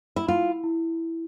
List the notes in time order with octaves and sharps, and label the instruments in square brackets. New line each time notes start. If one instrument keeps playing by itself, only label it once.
[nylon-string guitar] E4
[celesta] E4 [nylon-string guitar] F4
[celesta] E4